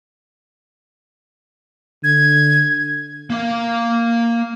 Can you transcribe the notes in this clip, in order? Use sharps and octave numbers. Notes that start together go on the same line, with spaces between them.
D3 G#6
A#3 F5